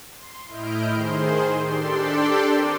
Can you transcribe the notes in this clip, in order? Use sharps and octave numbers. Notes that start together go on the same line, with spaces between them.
C6
A2 E4 D#5 F6 G6 D7
D#3 G#4 C5 C6
D4 G4 A4 D5 G5 C6
C4 A#4 D#7